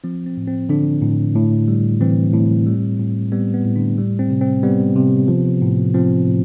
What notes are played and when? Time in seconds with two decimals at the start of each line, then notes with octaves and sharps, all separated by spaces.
0.04 F3 C4
0.26 C4
0.37 A2
0.48 C4
0.69 D3 F3 D4
1.02 A2
1.35 A2
1.68 G3
2.01 E3 C4
2.34 A2
2.67 G3
2.99 A2
3.32 G3 B3
3.54 B3
3.65 A2
3.76 D3 D4
3.98 G3
4.19 C4
4.30 C3
4.41 C4
4.63 G3 B3
4.96 C3
5.28 F3
5.62 A2
5.94 F3 C4
6.27 A2